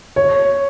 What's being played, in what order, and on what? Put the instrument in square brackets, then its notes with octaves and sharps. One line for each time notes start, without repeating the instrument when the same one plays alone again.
[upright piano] C#5